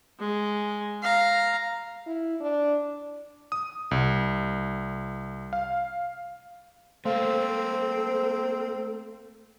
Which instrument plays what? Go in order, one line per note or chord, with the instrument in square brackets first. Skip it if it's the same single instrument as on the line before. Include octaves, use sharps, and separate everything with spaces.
[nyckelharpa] G#3
F5 A#5
[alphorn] E4
D4
[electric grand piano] D#6
C2
F5
[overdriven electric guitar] A3 A#3 [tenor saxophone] C4 [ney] A4 [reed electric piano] C5 F5